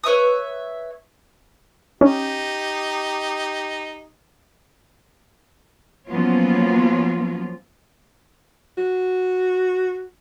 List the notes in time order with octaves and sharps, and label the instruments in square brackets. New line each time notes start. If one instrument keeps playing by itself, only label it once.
[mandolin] B4 C#5 E5 D#6
[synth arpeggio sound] C#4 [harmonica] D#4 G4
[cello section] F3 F#3 A#3 B3 C#4 F4
[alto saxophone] F#4